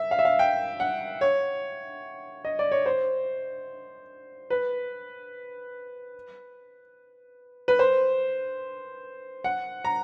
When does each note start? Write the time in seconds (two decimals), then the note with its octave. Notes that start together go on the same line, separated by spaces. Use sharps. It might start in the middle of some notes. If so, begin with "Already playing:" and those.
Already playing: E5
0.11 F5
0.19 E5
0.25 F5
0.39 G5
0.80 F#5
1.21 C#5
2.45 D#5
2.59 D5
2.71 C#5
2.86 C5
4.50 B4
7.68 B4
7.79 C5
9.44 F#5
9.85 A#5